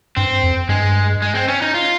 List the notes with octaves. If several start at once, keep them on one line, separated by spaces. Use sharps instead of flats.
G2 C4
F2
G2 G#3
G#3
C4
C#4
D#4
F4